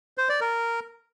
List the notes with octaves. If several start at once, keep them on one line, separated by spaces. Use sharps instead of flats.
C5
D5
A#4